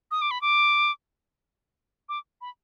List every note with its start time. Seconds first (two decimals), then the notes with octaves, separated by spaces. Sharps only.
0.11 D#6
0.22 D6
0.31 B5
0.42 D6
2.09 D6
2.41 B5